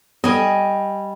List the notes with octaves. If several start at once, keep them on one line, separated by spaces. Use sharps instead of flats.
G3 B3 A4 D#5 G#5